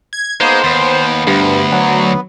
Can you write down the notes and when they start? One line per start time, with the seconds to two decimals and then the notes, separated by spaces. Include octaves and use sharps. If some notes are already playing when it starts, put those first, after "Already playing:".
0.13 G#6
0.41 G#3 A#3 B3 D#4 C5
0.64 D#2 B3
1.27 D2 G2
1.72 F#3